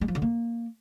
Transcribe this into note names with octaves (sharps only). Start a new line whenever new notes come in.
G#3
F3
D3
A#3